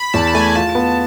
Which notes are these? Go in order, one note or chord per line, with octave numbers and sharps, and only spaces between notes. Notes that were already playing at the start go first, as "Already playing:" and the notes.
Already playing: B5
E2 A5
A5
A3 G#5
F4 A5
B3